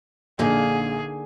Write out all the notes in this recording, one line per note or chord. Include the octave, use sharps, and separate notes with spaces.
A#1 D3 A#3 D#4 G#4